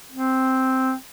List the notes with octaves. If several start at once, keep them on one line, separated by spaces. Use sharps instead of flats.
C4